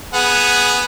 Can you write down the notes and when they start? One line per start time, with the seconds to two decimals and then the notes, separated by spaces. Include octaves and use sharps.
0.14 B3 G#4 F#5